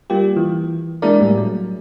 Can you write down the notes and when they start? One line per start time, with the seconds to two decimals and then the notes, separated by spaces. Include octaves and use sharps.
0.10 G3 A#3 F4 G4
0.36 E3
1.02 G#3 A#3 D4 E4 A#4 D5
1.20 A2 G3
1.38 F#3